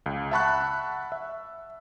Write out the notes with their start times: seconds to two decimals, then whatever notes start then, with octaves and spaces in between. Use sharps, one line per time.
0.06 C#2
0.31 E5 F#5 A5 B5 C#6 F#6
1.12 E5